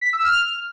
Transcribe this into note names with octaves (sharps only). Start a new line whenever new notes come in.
B6
E6
F6